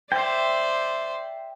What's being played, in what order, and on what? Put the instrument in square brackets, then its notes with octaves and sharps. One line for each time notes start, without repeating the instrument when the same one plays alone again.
[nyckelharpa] C5 D5 [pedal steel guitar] E5 G5